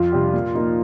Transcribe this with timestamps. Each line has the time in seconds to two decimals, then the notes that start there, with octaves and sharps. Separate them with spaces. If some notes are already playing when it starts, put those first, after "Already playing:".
Already playing: F2 F4
0.12 C3 G3 D4 G4
0.33 A#2
0.55 F3 A#3 D#4